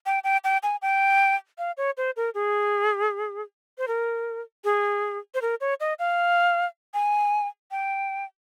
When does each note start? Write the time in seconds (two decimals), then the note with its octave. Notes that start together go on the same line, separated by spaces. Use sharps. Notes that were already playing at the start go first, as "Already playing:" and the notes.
0.06 G5
0.24 G5
0.44 G5
0.63 G#5
0.82 G5
1.58 F5
1.77 C#5
1.97 C5
2.17 A#4
2.34 G#4
3.78 C5
3.88 A#4
4.64 G#4
5.35 C5
5.42 A#4
5.61 C#5
5.80 D#5
5.99 F5
6.94 G#5
7.71 G5